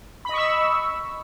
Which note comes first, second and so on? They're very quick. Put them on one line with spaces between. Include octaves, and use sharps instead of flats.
B5 D#5 C#6 E6